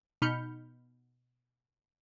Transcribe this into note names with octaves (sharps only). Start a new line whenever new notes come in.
B2 D#4 B5 F6 G6 C#7